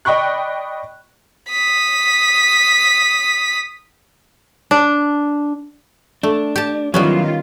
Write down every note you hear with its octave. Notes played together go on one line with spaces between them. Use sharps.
D5 D#5 G5 B5 C#6 F#6
D#6 B6
D4
A3 D4
G4 A5
D#3 F#3 G3 B3 C#4 E4 F4